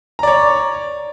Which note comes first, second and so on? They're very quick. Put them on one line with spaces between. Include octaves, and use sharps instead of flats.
A#5 D5 C#5